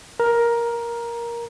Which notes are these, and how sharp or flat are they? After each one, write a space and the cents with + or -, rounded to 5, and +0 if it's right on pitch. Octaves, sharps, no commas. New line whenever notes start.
A#4 +10